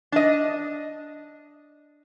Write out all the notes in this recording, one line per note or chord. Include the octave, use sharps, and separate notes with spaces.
D4 D#5